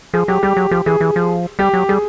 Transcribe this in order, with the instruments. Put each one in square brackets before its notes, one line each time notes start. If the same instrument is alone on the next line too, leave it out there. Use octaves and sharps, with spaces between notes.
[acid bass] F3 [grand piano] G#4
[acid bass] F#3 [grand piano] G4
[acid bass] G3 [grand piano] G4
[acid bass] F#3
[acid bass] F3 [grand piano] G4
[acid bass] E3 [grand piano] G#4
[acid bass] E3
F3
[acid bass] G3 [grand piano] G4
[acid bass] F#3
[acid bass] G3 [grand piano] G#4